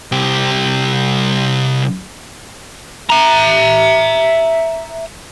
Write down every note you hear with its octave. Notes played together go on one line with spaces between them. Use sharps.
C2 G4
E5 A#5